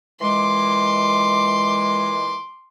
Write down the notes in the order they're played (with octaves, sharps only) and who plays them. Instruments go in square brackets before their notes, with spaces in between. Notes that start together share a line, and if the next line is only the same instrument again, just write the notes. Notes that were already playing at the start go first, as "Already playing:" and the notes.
[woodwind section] A#2 E3 G#3 [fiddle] C6 D6